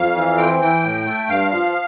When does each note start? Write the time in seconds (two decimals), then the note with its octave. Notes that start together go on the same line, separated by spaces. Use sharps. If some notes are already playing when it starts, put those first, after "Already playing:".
Already playing: F2 F5
0.15 E3
0.37 C4 G5
0.61 E3 G5
0.83 A2
1.06 A3
1.29 G2 F5
1.52 F3